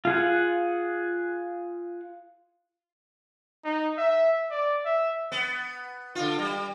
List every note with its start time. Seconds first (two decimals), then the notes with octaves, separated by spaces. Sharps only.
0.05 F4 G#4 F#5
3.65 D#4
3.98 E5
4.51 D5
4.85 E5
5.32 B3
6.15 D3 F4
6.39 G3